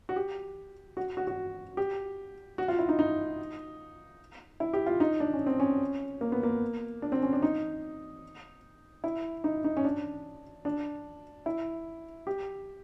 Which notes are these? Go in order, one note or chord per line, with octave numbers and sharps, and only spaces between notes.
F#4
G4
F#4
F#4
F#4
G4
F#4
F4
E4
D#4
D#4
E4
G4
F4
D#4
D4
C#4
C4
C#4
A#3
B3
A#3
D4
C4
C#4
D4
D#4
E4
D#4
D#4
C#4
D4
D4
E4
G4